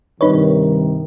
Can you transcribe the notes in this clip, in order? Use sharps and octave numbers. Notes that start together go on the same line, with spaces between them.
G2 C3 D#3 D#4 B4 C#5